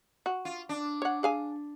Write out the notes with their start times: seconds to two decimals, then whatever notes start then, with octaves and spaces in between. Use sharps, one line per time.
0.26 F#4
0.45 F4
0.69 D4
1.02 C#5 F#5
1.23 G#4 F5 G#5